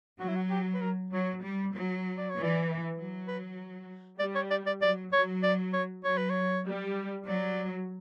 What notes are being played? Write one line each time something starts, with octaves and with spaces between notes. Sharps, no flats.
F#3 F#4
E4
F#4
G4
B4
A#4
F#3 C#5
G3
F#3
D5
C#5
E3
D5
F#3
B4
G3 D5
C#5
D5
D5
F#3 D5
F#3 C#5
D5
C#5
F#3 C#5
B4
C#5
G3
F#3 D5